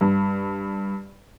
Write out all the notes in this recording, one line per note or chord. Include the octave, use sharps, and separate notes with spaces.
G2